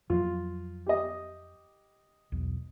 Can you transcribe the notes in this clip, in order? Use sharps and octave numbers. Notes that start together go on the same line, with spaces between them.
F2 F3 F#3 F4
G4 D#5
B1 E2